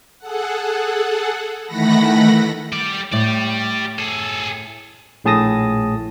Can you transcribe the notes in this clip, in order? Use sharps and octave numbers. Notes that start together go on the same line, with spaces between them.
G#4 A4 F#5
D#3 E3 A3 F#5 B5 A#6
G3 D5
A2 G4 D5
G#4 A4
A#1 A2 G#4 A5 D#6 A#6